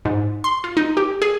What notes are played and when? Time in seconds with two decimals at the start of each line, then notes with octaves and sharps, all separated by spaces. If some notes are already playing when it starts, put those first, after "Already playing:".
0.05 G#2
0.44 C6
0.64 F4
0.77 D#4
0.97 G4
1.22 G#4